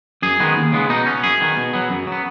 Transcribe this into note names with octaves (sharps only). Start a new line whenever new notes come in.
F#2 G#4
D#3 G#3 B3
D#2
C#3 G#3 B3
B2 D#4
B3 C#4
F#2 G#4
D#3 B3
B2
F#3 B3
F#2
F#3
B3